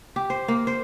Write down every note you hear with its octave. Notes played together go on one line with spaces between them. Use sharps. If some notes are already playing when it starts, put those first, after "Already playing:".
G4
C5
A#3
C5